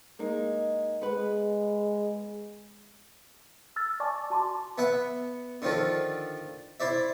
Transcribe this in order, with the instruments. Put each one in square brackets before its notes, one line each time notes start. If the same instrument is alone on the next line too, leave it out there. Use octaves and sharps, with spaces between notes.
[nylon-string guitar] G#3 A#3 D#4
[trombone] G#3 [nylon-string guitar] B3 B4
[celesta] E6 F6 A6
D5 G#5 A5 C#6 D6 A6
F#4 A5 C6 D6
[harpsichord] B3 E5 F#5
D3 D#3 F3 A4
E4 C5 D5 E5